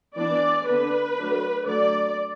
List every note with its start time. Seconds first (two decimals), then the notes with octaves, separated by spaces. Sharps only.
0.16 E3 B3 D4 D5
0.66 D3 B3 D4 B4
1.16 F#3 A3 D4
1.66 D3 F#3 A3 D5